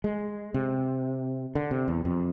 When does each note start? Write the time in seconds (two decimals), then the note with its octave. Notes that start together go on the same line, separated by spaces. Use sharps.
0.04 G#3
0.54 C3
1.55 D3
1.71 C3
1.88 E2
2.05 F2